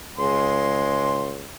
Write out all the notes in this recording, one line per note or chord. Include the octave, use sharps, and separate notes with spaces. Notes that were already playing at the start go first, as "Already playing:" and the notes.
C#2 G#3 C6